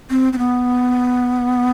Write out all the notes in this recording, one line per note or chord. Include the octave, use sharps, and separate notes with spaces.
C4
C4
B3